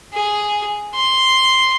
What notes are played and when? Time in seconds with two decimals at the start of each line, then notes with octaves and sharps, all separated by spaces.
0.14 G#4
0.95 C6